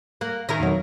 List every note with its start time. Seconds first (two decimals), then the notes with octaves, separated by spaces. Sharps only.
0.21 A#3 F#6
0.49 D#3 C#4 E4 A#4 A#6
0.60 F2 B2 F#3